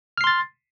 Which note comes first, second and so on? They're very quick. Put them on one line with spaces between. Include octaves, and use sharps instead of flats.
F6 C7 C6 A6